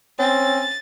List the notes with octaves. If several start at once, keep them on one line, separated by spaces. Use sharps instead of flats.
C4 C#4 A6